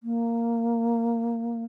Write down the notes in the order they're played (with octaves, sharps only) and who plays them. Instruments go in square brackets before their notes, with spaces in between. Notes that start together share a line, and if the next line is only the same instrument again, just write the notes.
[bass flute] A#3